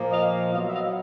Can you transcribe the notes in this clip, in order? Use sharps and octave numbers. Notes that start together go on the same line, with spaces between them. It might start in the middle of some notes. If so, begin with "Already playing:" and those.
Already playing: A#2 F3 A#3
D#5 F5
B2 F#3 B3 D#5 F5
E5
D#5 F5